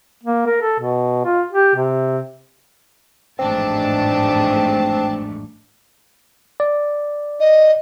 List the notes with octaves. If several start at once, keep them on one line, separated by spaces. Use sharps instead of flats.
A#3
A#4
A4
B2
F4
G4
C3
A1 F2 G#2 A3 C4 D4 A5
D5
D#5